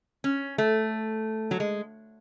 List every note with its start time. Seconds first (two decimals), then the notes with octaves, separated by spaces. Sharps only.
0.24 C#4
0.58 A3
1.51 F#3
1.60 G#3